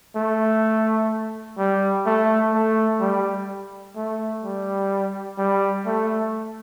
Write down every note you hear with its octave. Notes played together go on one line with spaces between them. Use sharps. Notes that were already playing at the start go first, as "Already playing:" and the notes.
A3
G3
A3
A3
G3
A3
G3
G3
A3